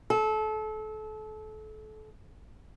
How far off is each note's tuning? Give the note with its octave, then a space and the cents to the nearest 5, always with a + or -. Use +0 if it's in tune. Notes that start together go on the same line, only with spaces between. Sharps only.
A4 -30